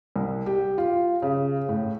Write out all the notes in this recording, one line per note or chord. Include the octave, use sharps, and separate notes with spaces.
C2
G4
F4
C#3
A2